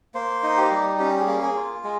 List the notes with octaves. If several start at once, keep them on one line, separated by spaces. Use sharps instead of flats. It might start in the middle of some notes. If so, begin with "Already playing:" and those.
A#3 C5
D#4
G4
G3
C#4 G4
G#4
A#3
G#4
F4
G#3 G#4